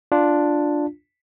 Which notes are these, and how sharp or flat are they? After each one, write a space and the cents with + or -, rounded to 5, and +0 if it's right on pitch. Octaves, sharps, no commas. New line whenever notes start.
D4 +0 F4 +0